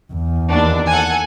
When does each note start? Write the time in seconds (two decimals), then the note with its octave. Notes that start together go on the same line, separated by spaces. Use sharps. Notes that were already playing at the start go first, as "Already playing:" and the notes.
0.13 E2
0.51 D#2 D4
0.89 A4 F#5 G#5